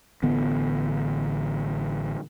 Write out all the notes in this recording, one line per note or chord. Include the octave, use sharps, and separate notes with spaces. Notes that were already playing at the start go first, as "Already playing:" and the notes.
A1 D3 B3